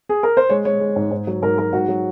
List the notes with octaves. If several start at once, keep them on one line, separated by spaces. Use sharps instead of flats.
G#4
A#4
C5
G#3 C#5
G#3 C#5
G#3
G#2
G#2
F#3
G#2 A#4
F#3 A#4
G#2 F#4
F#3